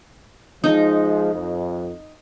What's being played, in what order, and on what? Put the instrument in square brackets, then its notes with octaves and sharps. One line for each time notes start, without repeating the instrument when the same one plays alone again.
[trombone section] F3 G#3 [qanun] D#4
[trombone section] F2